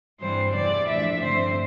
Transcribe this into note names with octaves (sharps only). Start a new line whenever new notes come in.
G2 E3 G3 C4 C5
E2 C3 E3 D5
A2 F3 A3 D4 E5
G2 D3 A3 C4 C5